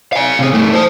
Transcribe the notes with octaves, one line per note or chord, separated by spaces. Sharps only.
F5 G#5
C3 G#4
G2 A3
C5 A5